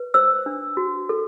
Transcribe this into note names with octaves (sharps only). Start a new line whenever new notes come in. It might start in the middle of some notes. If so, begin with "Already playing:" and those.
Already playing: B4
C5 E6
D4
F#4
A4